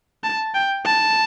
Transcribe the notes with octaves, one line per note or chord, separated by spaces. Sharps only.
A5
G5
A5